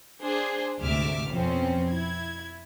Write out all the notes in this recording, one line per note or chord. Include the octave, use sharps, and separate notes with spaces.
D4 G#4 C5
D2 G#2 C3 E5 D6 F6
F2 B2 F3 C4 C#4
E4 G#6